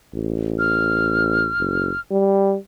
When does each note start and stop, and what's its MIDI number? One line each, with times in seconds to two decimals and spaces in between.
0.15 1.53 33
0.59 2.00 89
1.59 1.91 30
2.11 2.56 55